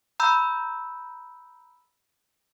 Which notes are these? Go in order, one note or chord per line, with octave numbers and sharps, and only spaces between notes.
A#5 B5 E6 G6